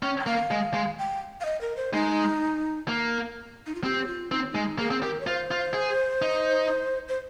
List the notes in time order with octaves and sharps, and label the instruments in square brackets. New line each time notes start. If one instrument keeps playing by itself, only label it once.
[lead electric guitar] C#4 [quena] G5
[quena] G5
[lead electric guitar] A#3 [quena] F5
[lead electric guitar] G#3
G#3
[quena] G5
F5
D#5
A#4
C5
[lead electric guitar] G#3 [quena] D#4
[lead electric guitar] A#3
[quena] D#4
F4
[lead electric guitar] C4 [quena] G4
[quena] F4
[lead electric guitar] C4 [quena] D#4
[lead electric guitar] G#3 [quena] D#4
[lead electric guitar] A#3 [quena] G#4
[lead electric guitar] C4
[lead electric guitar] G4 [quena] A#4
[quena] C#5
[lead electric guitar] F4 [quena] C5
[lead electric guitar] F4
G#4
D#4
[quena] C5